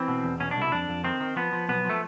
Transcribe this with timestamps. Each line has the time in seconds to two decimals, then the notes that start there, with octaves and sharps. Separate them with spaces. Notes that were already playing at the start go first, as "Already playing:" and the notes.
Already playing: E3 C4
0.08 B2
0.24 E2
0.40 B2 C#4
0.51 D4
0.56 C2
0.62 E4
0.72 F2 D4
0.89 F2
1.04 D#3 C4
1.20 D#3
1.36 F3 B3
1.53 F3
1.69 B1 B3
1.85 F3 A3